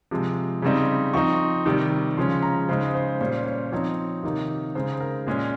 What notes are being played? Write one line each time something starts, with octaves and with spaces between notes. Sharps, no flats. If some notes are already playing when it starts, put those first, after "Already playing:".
C3 F3 G#3
C#3 G3 C4 D#4
F3 C4 D#4 C#6
C3 D#3 G3
C#3 F3 G#3 C#4 C6
A#5
C#3 G#3 D#4 C5
C5
A#2 G3 C#4 C5
C#5
F3 C4 D#4 C#5
C3 D#3 A#3 D#4
C#3 G#3 D#4 C5
A#4
A#2 G#3 C#4 G#4